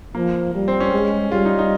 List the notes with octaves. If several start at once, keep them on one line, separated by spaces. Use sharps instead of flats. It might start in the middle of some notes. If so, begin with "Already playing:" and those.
F3 A#3
G3
C4
C#4
G#3
G3 F4
D#4
D#4